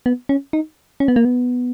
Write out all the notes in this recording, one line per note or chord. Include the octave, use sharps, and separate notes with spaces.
B3
C#4
D#4
C#4
B3
A#3
B3